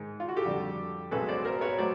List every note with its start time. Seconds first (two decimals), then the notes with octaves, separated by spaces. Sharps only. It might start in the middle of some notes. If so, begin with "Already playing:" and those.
Already playing: G#2 D#3 G#3
0.20 F4
0.29 F#4
0.36 G4 A4
0.45 F2 D3 G3
1.11 B1 B2 G#3 C#4 A4 B4
1.28 C5 D5
1.45 A#4 C5
1.61 B4 C#5
1.78 F#3 A3 C5 D5